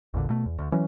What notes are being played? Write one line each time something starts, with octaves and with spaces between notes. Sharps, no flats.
A1 E2 A#2 D3
B2 A3
E2
D2
E3 F#3 C#4